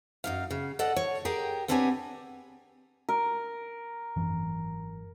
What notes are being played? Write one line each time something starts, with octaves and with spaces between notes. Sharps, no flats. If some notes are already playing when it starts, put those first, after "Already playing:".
F#2 D#4 F5
C#3
A4 D5 D#5 F#5
C#5
G4 G#4 A#4 G5
B3 C4 D4 G4 C#5 G#5
A#4
G#1 F#2 E3